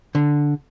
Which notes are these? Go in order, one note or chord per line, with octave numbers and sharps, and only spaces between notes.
D3